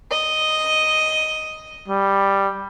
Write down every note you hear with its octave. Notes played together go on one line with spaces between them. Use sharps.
D#5
G3